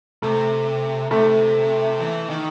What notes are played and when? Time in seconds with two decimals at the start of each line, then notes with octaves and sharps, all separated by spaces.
0.22 C3 A3
1.11 C3 A3
2.00 E3
2.30 D#3